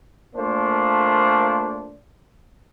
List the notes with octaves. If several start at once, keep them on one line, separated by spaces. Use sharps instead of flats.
A#2 A3 A#3 D4 C5